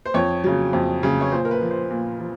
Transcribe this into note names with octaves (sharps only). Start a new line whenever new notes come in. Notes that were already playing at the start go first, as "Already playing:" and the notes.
C5
F2 C#5
C#3 F#3
F2
C#3 F#3
C#5
A#2 C5
A#4
B4
F3
C5
A#2
F3